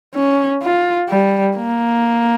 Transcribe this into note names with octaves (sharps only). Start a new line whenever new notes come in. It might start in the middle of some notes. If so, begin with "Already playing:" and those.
C#4
F4
G3
A#3